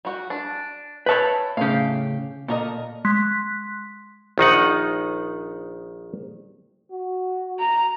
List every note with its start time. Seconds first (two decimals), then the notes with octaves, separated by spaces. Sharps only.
0.05 G3 F#4
0.30 D4
1.06 B4 C#5 E5 G5 A5
1.57 A2 C#3 G4 F5
2.48 A#2 A4 A#4 D#5
3.05 G#3 C6 F#6 B6
4.38 A#1 D#3 D#4 F#5
6.91 F#4
7.59 A#5